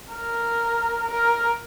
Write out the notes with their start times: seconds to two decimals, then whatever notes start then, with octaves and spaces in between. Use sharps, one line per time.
0.13 A#4
1.11 A#4